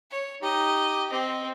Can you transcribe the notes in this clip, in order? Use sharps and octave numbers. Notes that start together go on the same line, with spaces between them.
C#5
D#4 G4 D#5
C4 D#5